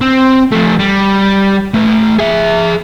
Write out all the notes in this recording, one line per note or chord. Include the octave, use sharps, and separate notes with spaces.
C4
F3 A3
G3
A3 B4
G#4 E5